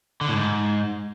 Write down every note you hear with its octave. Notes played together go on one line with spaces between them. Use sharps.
D3
A2
G#2